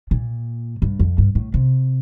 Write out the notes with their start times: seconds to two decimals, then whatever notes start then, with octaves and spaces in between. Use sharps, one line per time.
0.11 A#2
0.82 G2
0.99 F2
1.18 G2
1.35 A2
1.54 C3